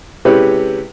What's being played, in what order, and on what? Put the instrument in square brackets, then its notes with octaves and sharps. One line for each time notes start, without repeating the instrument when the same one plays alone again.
[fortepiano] C3 G#3 C#4 E4 G4 B4